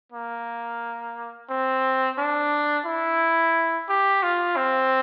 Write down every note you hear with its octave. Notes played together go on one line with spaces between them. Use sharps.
A#3
C4
D4
E4
G4
F4
C4